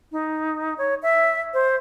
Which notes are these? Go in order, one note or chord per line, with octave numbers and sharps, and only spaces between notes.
D#4
C#5
E5
C5